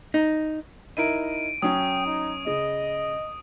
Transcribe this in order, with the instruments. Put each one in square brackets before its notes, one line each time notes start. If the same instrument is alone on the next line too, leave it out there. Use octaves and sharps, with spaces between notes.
[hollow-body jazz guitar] D#4
[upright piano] D#4 E4 A#4 [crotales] D7 D#7
[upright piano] F#3 C#4 [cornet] G5 [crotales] D#6
[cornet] D#4
[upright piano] C#3 [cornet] D#5